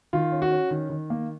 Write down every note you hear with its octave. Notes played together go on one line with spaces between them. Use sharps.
D#3 F4
C#4
F#4
C#4
D#3
D#3
A#3